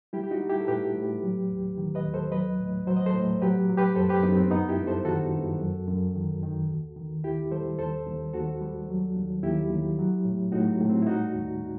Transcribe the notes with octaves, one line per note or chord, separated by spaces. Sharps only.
G3 E4 G4
G4
D#4 F#4
G3
E4 G4
A4
A2 G4 B4
A2
F#3
D#2
D#3
B4 D#5
D#2
A4 C5
F#3 B4 D#5
A2
F#3 C5
D#5
A4 C5
A2
F#3 G4 B4
F#3
G4 B4
F#2 A4 C5
G4 B4
F#2 B3 D#4
C4
G2 B3 D#4
E4 G4
G2
A4 C5
D#3 F#4 A4
G2
F#2
F#2
D#3
D#3
D#2
D#3
D#2 E4 G4
G3 A4 C5
D#2 A4 C5
D#2
D#2 F#4 A4
G3
F#3
D#2
D#2 E4 G4
D#2
F#3
A2
A2 D#4 F#4
A2
C4
E4
G3 D#4 F#4
D#2